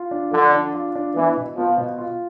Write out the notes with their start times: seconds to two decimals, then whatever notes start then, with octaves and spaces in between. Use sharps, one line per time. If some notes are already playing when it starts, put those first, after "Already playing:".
Already playing: F4
0.11 D4
0.32 D3 F3
0.53 D4
0.74 F4
0.95 D4
1.16 E3 B3
1.37 B2
1.57 F3 B3
1.78 B2
1.98 F4